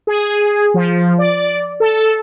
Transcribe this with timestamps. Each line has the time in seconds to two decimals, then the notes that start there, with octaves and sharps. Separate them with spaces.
0.07 G#4
0.74 F3
1.19 D5
1.80 A4